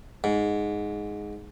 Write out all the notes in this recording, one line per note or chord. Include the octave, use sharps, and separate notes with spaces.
G#2